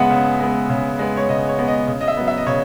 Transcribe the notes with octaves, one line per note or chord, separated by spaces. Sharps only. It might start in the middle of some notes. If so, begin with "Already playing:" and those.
Already playing: C#3 G#3 B3 E5 F#5
C#3
G#3 B3
C#3
G#3 B3
C#5
C#3 D#5
C#5
G#3 B3
D#5
C#3
D#5
E5
F#3 B3
E5
D#5
C#3 C#5